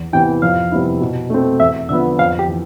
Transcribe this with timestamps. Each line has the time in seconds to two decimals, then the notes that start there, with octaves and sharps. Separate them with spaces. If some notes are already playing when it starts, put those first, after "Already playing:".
Already playing: E2
0.13 C3 E3 B3 E4 G5
0.42 F2 F5
0.72 C3 G3 B3 E4
1.01 B2
1.30 A3 C4
1.60 E2 E5
1.89 D3 F3 B3 E5
2.19 F2 F5
2.39 G4
2.48 E3